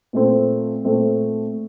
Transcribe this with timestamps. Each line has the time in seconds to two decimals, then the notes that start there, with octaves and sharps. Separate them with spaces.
0.13 A#2 A3 C4
0.84 A#2 A3 C4